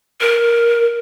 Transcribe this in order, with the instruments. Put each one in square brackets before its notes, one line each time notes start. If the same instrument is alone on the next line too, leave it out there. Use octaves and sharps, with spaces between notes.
[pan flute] A#4